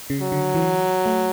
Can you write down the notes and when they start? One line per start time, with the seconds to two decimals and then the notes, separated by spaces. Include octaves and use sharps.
0.10 C#3
0.21 F#3
0.32 D3
0.55 E3
1.06 A3